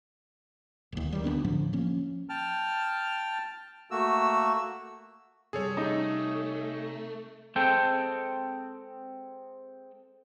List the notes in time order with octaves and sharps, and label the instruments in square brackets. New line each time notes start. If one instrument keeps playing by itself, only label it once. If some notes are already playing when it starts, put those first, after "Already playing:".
[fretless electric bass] D1 D#2
D#3 G3
D2 A#3 B3 D4
A2 D3 F3 F#3
F3 A#3 C#4
[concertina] G5 A5 F6
A3 A#3 F#4 E6
[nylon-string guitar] C3 G3 [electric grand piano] G#4 A4 C#5
[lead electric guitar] A3 [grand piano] D#4
[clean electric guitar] G#3 C4 A4 G5